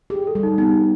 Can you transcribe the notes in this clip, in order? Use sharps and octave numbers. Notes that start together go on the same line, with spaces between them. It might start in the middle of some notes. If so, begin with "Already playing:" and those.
G4 G#4
A4
G3
D#4
B3 D#4